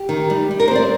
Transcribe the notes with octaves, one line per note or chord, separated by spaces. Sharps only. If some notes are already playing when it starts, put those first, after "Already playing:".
Already playing: G4
D#3
G3
G3
A#4
C5
C4 D5